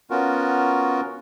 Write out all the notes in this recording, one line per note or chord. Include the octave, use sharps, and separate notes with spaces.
B3 C#4 F4 F#4 A#4